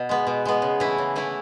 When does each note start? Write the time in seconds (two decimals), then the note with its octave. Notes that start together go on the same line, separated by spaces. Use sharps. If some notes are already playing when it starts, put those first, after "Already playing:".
Already playing: B2
0.09 G#3 B3
0.27 B2
0.45 G#3 B3
0.62 C#3
0.80 E3 A3 E4
0.98 C#3
1.16 E3 A3 E4